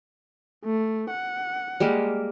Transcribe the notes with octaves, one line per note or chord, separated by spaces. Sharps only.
A3
F#5
G3 G#3 A#3